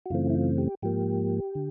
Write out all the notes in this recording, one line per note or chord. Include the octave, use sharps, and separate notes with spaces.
F#4
F#2 C#3 E3 A3 C4 F4
E4
F4
G4
G#2 F3 A#3 G4
D3